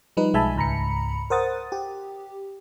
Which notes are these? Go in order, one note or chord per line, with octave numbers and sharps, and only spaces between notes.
F3 G3 D#4 B4
B1 G#3 E5 G#5 A5 B5
C#2 G#2 A#5 B5 C#7
A#4 C5 F#5 D#6 A6
G4